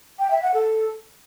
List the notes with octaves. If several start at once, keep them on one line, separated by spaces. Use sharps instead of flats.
G5
E5
F#5
A4